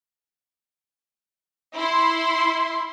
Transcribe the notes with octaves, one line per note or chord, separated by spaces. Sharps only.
E4 C6